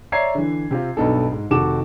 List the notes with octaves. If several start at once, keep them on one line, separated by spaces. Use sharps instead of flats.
C#5 D5 E5 A#5 G#6 C7
D3 E3
C3 C4 F4
B1 G2 B3 D#4 A4
G#2
F1 D#3 F#4 A4 D6 E7